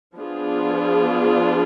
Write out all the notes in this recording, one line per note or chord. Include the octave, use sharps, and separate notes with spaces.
F3 B3 D4 F4 G#4